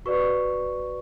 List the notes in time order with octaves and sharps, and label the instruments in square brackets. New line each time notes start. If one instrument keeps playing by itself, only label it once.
[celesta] F#4 B4 D5 C#6